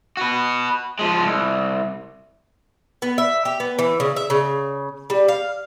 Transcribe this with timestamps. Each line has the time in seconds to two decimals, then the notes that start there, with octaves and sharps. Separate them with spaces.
0.17 F#4 B4
0.99 F3 G#3
1.24 C2
3.02 B3
3.18 E5
3.45 G4
3.60 B3
3.79 E3
4.00 C#3
4.16 E5
4.30 C#3
5.10 G3
5.28 F5